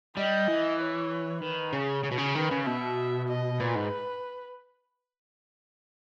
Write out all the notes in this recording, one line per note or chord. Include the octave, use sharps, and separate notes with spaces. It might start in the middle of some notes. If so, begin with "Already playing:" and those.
G3 D#5
E3
C#5
D#3 B4
C#3 C#5
C#3
B2
C#3
D#3 B4
C#3
B2 E5
D#5
A#2 B4
G#2